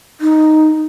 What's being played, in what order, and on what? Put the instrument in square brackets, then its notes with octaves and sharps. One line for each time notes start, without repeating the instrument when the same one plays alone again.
[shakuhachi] D#4